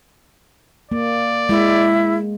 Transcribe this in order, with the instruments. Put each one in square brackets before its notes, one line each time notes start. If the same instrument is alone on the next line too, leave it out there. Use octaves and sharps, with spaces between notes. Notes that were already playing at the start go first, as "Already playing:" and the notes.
[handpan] A#3 [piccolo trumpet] D5
[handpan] G#3 [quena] E4